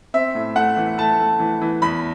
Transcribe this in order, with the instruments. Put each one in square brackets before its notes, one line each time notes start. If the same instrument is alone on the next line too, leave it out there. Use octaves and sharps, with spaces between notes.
[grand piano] C4 E5
A2
A3 F#5
E3
A3 A5
A3
E3
E3
E2 B5